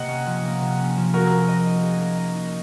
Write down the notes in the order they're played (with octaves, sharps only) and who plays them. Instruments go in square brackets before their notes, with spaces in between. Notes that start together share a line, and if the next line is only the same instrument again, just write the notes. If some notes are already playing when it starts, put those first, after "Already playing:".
Already playing: [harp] C3 A#3 [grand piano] D#5 F#5
[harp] C#4
F3
A#3
C3
C#4
F3
[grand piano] F#4 A#4 [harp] G#4
[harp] A#3
D#5
D#4
G#4
A#3
D#5
D#4